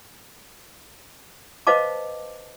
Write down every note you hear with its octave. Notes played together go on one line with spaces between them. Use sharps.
B4 C5 D#5 F5 A5 D6